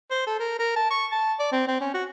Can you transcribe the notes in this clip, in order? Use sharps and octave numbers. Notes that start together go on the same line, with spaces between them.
C5
A4
A#4
A#4
A5
C#6
A5
D5
C4
C4
C#4
F#4